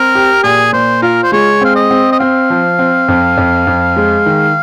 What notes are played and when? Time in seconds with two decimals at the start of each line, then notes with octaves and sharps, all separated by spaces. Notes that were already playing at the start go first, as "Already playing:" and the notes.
Already playing: C4 A#4
0.15 G4
0.44 A#2 G#4
0.73 A#2 C5
1.02 F4 A#4
1.24 C5
1.32 G#3 C#5
1.61 C4 F5
1.76 D#5
1.91 C4
2.12 D#5
2.20 C4 F5
2.50 F3
2.79 C4
3.08 F2
3.37 F2
3.67 F2
3.96 G#3
4.26 D#3